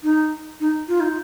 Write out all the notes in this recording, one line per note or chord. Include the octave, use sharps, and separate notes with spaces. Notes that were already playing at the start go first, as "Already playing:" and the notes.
D#4
D#4
F4
D#4